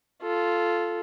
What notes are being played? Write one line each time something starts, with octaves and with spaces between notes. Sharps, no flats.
F4 A4